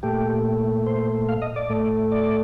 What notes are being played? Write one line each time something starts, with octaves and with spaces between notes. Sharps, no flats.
A#2 A3 G4
C5
F5
D#5
D5
A2 A3
D5